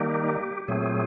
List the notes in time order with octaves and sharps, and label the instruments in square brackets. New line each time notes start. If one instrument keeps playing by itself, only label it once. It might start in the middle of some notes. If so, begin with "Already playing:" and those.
Already playing: [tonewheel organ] D#3 G3 A#3 D#4 G4
A#2 F#3 A3 C4 G#4